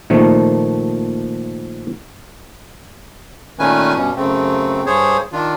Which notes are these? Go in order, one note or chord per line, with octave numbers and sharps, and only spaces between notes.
A#2 D#3 F3 A3
A#2 D#3 A3 C#4 B4 G#5
G2 B2 C#4
F#2 C#3 A3 C4
G2 G#4 C5 C#5
D#3 D4 F4